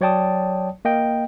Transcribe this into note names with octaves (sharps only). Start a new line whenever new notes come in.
F#3 C#5 D5 G5 A5 D#6
A#3 D#5 G5